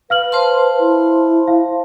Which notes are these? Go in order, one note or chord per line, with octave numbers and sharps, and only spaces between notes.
B4 F5 F6 F#7
C5 A5 C6
E4
F5